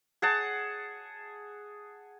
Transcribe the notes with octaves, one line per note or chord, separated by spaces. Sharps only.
G#4 F#5 A5